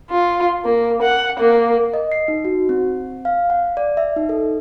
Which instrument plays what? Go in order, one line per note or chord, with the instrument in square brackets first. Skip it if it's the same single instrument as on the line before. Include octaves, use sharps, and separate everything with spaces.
[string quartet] F4
A#3
F#5
A#3
[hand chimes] D#5
C7
D#4
F#4
C4
F5
F#5
D5
E5
D#4
A4